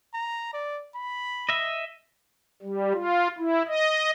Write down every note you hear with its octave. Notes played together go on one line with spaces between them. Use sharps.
A#5
D5
B5
D#5 E5
G3
F4
E4
D#5